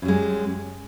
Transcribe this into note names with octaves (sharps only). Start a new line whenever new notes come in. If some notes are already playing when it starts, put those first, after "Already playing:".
F#2 G3 G#3